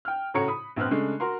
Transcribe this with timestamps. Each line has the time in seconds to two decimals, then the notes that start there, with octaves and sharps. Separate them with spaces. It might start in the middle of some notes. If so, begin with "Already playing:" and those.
0.05 G5 F6
0.34 A2 C#3 F#4 C#5 A#5 C#7
0.48 B5 D#6
0.76 A#1 B3 C4 F6 F#6
0.91 C#3 G#3 A3 D4
1.20 F#4 A#4 C6